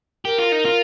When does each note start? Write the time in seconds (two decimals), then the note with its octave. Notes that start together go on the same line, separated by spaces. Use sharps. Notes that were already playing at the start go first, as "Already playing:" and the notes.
0.25 G4 A#4
0.38 F4
0.52 D#4
0.65 F4